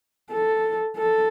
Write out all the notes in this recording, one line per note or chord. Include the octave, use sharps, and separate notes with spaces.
A4
A4